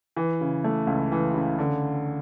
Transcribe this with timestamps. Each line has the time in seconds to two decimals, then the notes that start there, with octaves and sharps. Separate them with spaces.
0.17 E3
0.41 C#3
0.64 A3
0.87 C#2
1.12 E3
1.34 C#3
1.59 D3